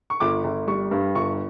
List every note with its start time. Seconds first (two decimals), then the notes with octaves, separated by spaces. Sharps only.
0.10 C#6
0.20 G1 D6
0.44 G1
0.67 G3 C#6
0.91 G2
1.15 G1 C#6